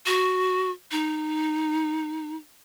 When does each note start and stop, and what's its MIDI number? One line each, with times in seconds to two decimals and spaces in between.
0.06 0.71 66
0.92 2.36 63